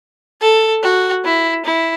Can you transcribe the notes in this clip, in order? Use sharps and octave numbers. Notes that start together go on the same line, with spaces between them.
A4
F#4
E4
E4